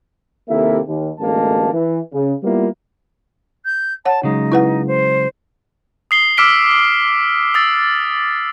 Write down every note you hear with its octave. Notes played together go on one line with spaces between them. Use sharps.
D#2 C3 A#3 E4 A4 E5
D#2
A1 D2 G#3 A#3 A5
E3
C#3
G3 A#3 B3 E4 F4
G6
C#5 F#5 A5
C#3 F#3 G#3 D#4
E4 B4 F#5
C5
D#6 C7 G7
D6 E6 F6 B6 D7 G7
D#6 E6 A6